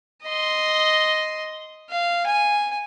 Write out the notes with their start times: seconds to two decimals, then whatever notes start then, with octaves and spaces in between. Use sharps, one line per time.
0.24 D#5 C6
1.90 F5
2.26 G#5